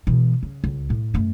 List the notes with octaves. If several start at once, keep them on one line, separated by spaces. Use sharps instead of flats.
B2 E3
C#3
C#2
A2
F#2 A3